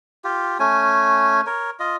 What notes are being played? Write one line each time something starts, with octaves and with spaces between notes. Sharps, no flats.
F4 G4
A3 C#4 G#5
A#4 C#5
F4 D#5